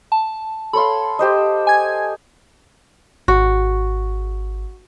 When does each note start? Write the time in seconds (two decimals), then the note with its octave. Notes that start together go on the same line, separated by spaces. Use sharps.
0.12 A5
0.73 A4 C#5 F5 B5 C6
1.19 G4 C5 D#5
1.67 G#5 G#6
3.28 G#1 F#4